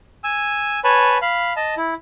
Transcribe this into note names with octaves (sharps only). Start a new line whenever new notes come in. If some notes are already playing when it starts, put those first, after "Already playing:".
G#5 E6
B4 C#5 G#5 A5 B5
F5 B5
D#5 A5
E4